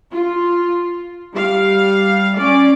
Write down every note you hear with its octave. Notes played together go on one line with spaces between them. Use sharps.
F4
G3 F5
C#4 D5